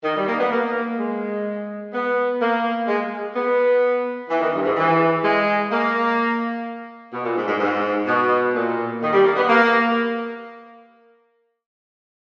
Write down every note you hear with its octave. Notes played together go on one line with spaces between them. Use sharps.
D#3
G3
A#3
B3
A#3
G#3
B3
A#3
G#3
B3
E3
D#3
G2
G#2
E3
G#3
A#3
B2
A#2
G#2
G#2
G#2
B2
A#2
D#3
G3
A#3
B3
A#3